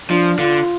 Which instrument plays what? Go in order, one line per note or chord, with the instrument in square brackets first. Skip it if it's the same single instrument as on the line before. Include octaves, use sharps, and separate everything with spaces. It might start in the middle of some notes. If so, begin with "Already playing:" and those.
[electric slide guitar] F3 [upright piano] D4
[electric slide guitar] D3 [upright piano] F4